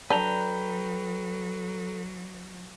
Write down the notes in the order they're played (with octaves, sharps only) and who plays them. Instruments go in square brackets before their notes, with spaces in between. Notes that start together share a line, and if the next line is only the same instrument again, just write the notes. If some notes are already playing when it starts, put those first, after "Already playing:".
[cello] F#3 [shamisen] D4 [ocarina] A4 [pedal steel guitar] B4 G5 A#5